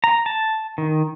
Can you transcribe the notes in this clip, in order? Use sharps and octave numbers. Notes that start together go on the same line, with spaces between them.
A#5
A5
D#3